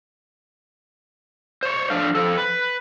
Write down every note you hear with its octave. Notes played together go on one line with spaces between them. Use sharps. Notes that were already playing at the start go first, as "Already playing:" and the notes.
C5 C#5
F3 A3 D4 F5
F3 A4
B4